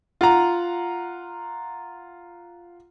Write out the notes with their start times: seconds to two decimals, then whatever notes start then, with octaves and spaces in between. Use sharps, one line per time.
0.21 F4 F#5 A#5